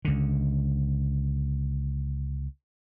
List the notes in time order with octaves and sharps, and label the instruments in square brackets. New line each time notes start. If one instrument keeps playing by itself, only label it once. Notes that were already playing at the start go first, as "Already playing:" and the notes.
[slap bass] C#2 D3